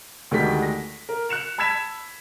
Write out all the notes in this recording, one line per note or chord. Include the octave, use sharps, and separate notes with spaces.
D2 D3 D#3 G#3 G4 B6
A#6
A#4
F#6 C#7 E7 F7
A5 B5 E6 G#6 B6 E7